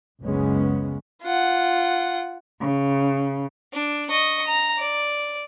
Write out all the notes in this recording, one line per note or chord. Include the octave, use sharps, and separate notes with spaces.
F#1 C#2 C#3 G#3 B3 C#4
F4 F#5
C#3
D4
D#5 C#6
A#5
D5